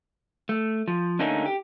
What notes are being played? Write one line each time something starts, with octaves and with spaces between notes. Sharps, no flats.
A3
F3
D3 A3 A#3 C#4 D#4
G4